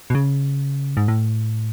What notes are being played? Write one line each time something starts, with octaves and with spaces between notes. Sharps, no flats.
B2
C#3
G#2
A2